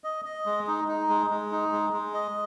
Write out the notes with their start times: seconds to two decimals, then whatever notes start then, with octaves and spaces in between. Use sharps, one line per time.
0.04 D#5
0.25 D#5
0.46 G#3
0.67 D#4
0.88 D#4
1.09 G#3
1.30 G#3
1.51 D#4
1.72 G#3
1.93 G#3
2.14 D#5